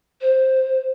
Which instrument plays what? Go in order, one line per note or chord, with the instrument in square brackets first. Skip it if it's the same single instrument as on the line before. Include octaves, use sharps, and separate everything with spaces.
[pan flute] C5